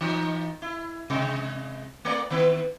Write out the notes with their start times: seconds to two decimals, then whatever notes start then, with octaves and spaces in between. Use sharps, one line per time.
0.01 E3 D#4
0.62 E4
1.10 C3 G#3
2.05 A3 A#3 D5
2.30 D#3 B3